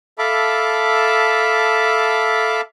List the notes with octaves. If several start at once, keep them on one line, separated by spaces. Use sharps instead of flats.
A4 E5 F5 A5 B5 D6